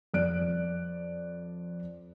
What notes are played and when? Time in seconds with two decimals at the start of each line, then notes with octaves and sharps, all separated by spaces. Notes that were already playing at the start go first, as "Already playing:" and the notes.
0.14 F2 D5 F#6 D7